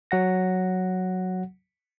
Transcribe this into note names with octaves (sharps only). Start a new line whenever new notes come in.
F#3 F#5 A#6